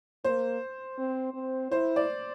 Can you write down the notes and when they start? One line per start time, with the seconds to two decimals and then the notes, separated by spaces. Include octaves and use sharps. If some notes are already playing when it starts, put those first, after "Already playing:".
0.24 A#3 C5
0.98 C4
1.34 C4
1.71 E4 C5
1.96 D5